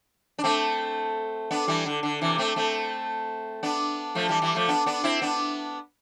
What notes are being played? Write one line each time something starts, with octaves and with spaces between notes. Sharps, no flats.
D4
A3 C4
B3 D4
E3 G3
D3
D3
C3 E3
A3 C4
A3 C4
B3 D4
F3 A3
E3 G3
E3 G3
F3 A3
B3 D4
B3 D4
C4 E4
B3 D4